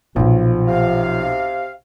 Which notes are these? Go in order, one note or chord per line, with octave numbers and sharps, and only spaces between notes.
B1 A#2 F3 F4
C3 F5